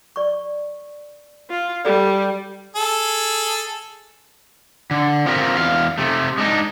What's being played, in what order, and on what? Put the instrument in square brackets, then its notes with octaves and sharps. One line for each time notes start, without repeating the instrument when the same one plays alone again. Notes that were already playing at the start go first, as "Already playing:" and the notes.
[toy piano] D5 C#6
[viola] F4
[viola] G3 [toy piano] A4 D5
[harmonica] G#4 A4
[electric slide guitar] D3
C4 F4 G4 A#4
E2 F5
C3 A3
G#3 D4 D#4